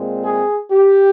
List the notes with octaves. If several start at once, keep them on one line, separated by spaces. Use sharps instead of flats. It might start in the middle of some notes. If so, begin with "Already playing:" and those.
Already playing: A#2 G#3 C4
G#4
G4